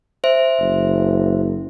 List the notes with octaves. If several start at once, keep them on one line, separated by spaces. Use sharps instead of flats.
C5 E5
F#1